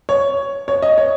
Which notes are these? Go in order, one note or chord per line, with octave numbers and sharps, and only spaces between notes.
C#5
C#5
D#5
C#5